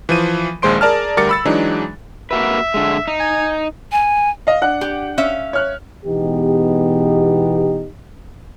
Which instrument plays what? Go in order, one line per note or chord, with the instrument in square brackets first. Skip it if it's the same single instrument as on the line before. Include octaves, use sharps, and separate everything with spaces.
[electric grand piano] E3 F3 D#7
A#1 D#2 G#3 C5 C6 D7
G#4 A#4 D5 A5 F6
D2 G3 A#4 D6 A6 C#7
B5 E6 A6
E3 F#3 G#3 D4 D#4
[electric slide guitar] A#3 F#4 B4 [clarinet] E5
[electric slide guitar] D3 G#3
D#4
[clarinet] G#5
[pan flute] G#5
[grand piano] D#5 F5
D4 F#5 F#6
[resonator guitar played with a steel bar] G4
C#4 E5 F5
[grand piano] C#5 F6 F#6
[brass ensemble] B2 E3 G#3 B3 D#4 G4